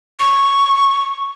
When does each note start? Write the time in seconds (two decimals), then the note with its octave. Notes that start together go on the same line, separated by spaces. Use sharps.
0.20 C#6